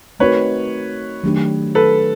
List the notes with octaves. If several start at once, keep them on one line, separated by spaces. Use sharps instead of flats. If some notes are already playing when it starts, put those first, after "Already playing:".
A3 C4 D#4 F#4 A#4 B4 C#5
D#3 F#3 A3 D4 G4
A4 B4